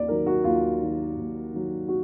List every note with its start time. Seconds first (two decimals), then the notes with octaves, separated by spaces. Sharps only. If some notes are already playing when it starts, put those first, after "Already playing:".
Already playing: D#2 D5
0.08 D#3 F#3 A#4
0.26 F#4
0.44 D#2 F4
0.81 D#3 F#3
1.16 D#2
1.52 D#3 F#3
1.88 F#4